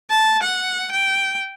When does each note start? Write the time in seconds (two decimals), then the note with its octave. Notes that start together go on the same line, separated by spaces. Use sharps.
0.10 A5
0.43 F#5
0.92 G5